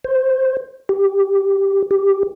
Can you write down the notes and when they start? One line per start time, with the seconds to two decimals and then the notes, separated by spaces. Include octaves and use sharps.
0.04 C5
0.89 G4
1.91 G4